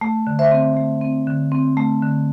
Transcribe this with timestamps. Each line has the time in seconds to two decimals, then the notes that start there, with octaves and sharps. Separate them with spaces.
0.01 A3
0.27 D3
0.39 C5 E5
0.51 C4
0.77 A3
1.01 C4
1.27 D3
1.52 C4
1.77 A3
2.03 D3